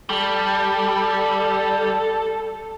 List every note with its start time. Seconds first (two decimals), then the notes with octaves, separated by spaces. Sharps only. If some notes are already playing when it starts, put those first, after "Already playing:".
0.10 G3 A4